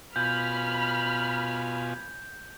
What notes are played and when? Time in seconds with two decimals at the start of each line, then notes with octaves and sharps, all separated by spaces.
0.16 B2 F4 G#5 B5 F6 G6